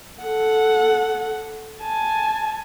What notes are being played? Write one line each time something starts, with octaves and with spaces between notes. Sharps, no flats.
A4 F#5
G#5 A5